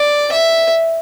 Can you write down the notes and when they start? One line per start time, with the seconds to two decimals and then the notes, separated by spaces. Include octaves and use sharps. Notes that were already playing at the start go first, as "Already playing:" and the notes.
Already playing: D5
0.32 E5